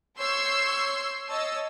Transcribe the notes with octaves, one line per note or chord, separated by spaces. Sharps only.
C#5 C6 C#6 E6 G6 C7
C#5 D#5 A5 E6